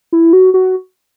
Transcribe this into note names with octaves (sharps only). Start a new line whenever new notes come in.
E4
F#4
F#4